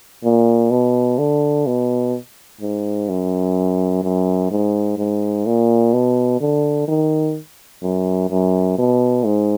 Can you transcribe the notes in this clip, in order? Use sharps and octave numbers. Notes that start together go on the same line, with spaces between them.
A#2
B2
D3
B2
G#2
F#2
F#2
G#2
G#2
A#2
B2
D3
D#3
F#2
F#2
B2
G#2